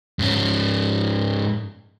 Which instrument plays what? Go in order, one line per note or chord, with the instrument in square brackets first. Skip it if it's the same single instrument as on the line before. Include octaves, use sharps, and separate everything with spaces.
[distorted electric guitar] G#2 C#4